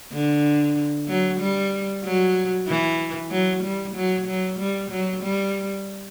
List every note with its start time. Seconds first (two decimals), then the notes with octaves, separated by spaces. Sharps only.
0.13 D3
1.08 F#3
1.41 G3
2.04 F#3
2.68 E3
3.31 F#3
3.63 G3
3.96 F#3
4.27 F#3
4.59 G3
4.91 F#3
5.23 G3